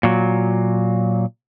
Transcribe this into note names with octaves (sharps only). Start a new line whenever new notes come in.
A#2 F#3